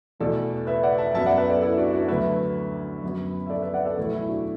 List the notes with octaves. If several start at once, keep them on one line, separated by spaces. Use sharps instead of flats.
E2 B2 A3 A4 D5
B4 E5
D5 F#5
E5 A5
F#2 F#3 B3 E5 A5
D5 F#5
B4 E5
A4 D5
E4 A4
D4 F#4
F#4 B4
D2 D3 F#3 A3 B4 E5
F#2 F#3 B3
E5
A4 D5
B4 E5
D5 F#5
A4 D5
E2 B2 F#3 A3 E4 A4
E4
D4 F#4